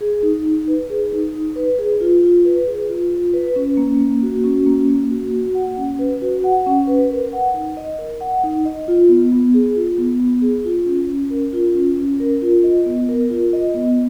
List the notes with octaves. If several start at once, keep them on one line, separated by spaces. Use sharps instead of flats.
G#4
D#4
D#4
B4
G#4
D#4
D#4
B4
G#4
F4
F4
B4
G#4
F4
F4
B4
C#4
A#3
A#3
F#4
C#4
A#3
A#3
F#4
F#4
F#5
C#4
B4
F#4
F#5
C#4
B4
A#4
F#5
D#4
D#5
A#4
F#5
D#4
D#5
F4
B3
B3
G#4
F4
B3
B3
G#4
F4
C#4
C#4
A#4
F4
C#4
C#4
A#4
F4
D#5
B3
A#4
F4
D#5
B3